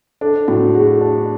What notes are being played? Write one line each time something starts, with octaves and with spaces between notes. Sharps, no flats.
D4 A4
A2 F#4
F#4 G#4
D4